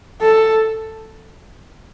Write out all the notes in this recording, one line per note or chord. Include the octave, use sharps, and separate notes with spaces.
A4